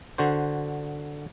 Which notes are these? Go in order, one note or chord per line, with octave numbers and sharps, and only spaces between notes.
D3 F#4 C5